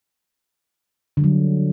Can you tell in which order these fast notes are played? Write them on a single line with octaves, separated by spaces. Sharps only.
D3 G3 F#3